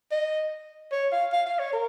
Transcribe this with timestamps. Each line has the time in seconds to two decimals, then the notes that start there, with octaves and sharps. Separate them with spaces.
0.11 D#5
0.92 C#5
1.12 F5
1.33 F5
1.46 F5
1.59 C#5
1.73 A#4